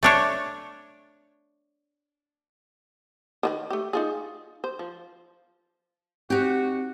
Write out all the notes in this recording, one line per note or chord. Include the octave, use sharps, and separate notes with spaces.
A3 D4 C#5
D#3 F#4 B4
A3 G4
D#4 F4 G#4
C5
F3
C4 D#4 F#4 G4